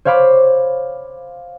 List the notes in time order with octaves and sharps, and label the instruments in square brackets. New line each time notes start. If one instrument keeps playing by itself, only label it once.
[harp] C5 C#5 F5 B5 D6